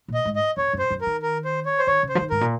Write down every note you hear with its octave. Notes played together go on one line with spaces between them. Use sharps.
A#2
D#5
G#2
D#5
F2 C#5
F#2
C5
F#2
A#4
D#3
A#4
C5
C#5
C5
D#3 C#5
C#3
C5
F3
D#3
G#2 A#4
A#2